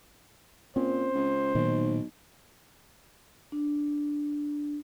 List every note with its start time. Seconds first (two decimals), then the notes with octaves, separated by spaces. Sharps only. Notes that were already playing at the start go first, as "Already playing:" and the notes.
0.76 A#2 C4 C#4 C5
1.15 C#2
1.55 B1 A#2 D#3
3.52 D4